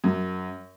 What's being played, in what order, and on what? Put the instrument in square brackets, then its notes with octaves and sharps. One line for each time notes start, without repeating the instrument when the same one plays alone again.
[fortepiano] F#2